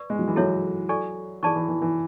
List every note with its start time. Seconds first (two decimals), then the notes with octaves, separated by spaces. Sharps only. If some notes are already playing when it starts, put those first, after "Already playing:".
Already playing: B4 D5 C#6
0.10 G#3
0.19 F#3
0.27 E3
0.36 F#3 E4 A4 C#5 E5
0.89 A4 D5 G#5 C#6
1.43 E3 G#4 D5 A5 C#6
1.55 E3
1.69 E3
1.82 E3